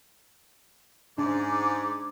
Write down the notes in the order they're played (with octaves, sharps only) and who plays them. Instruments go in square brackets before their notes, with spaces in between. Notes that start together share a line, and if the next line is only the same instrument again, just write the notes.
[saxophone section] G#2 [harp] D4 [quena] D6